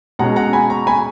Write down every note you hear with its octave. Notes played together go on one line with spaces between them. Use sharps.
B2 G#3 C#4 F#5 A#5
F#5 A#5
G#5 B5
A#5 C#6
G#5 B5